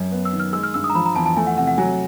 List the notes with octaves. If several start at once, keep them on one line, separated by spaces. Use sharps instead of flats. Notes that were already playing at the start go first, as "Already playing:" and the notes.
Already playing: F#2
B3
E6
D#3
F6
G#3 E6
F6
G2 E6
D#6
A#5
F3 B5
A#5
E2 A5
A5
A3 G#5
F#5
C3 F#5
F#5
F#3 G#5